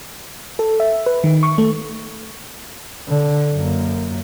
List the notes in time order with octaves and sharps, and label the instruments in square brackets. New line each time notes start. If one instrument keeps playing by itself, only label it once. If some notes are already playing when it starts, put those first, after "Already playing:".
[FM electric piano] A4
E5
B4
D#3
C#6
A3
[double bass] D3
F#2 A#3